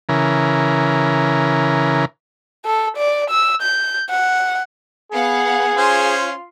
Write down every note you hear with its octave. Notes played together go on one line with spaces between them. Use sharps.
C#3 E3 A#4
A4
D5
E6
G6
F#5
B3 G#4 F5 F#5
C#4 F4 C5 C6